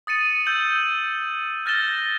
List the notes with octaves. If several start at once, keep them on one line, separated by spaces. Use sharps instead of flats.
D#6 A6 C#7 D#7
E6 G6 F#7
F6 G6 A6 A#6 E7 G7